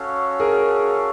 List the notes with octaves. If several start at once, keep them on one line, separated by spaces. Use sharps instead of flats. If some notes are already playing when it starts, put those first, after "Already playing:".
Already playing: C#4 F#4 A4 C#5 F5
G#4 A#4